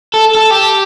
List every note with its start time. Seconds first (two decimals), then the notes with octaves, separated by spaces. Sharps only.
0.14 A4
0.35 A4
0.51 G4